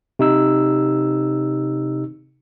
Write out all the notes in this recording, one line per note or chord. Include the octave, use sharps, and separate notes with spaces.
C3 D#4 E6